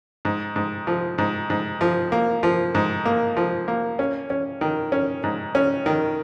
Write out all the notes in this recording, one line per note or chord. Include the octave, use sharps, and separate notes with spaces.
G#2
G#2
F3
G#2
G#2
F3
A#3
F3
G#2
A#3
F3
A#3
C#4
C#4
D#3
C#4
G#2
C#4
D#3